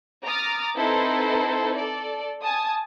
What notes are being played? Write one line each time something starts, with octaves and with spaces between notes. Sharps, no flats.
A#5 D6 D#6 F6 A6
C4 D#4 E4 A4 B4 C5
A4 D5
G#5 A5 D#6